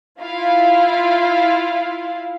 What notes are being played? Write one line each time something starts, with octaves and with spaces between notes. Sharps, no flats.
E4 F4 F5